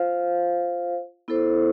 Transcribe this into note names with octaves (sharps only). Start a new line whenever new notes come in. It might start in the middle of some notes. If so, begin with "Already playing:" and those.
Already playing: F4 C5 F5
B3 E4 A4 C5